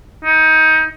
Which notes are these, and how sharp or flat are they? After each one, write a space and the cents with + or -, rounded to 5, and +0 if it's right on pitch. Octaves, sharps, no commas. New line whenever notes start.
D#4 +25